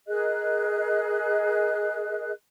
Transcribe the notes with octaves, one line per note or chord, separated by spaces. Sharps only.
G#4 A#4 D#5 F#6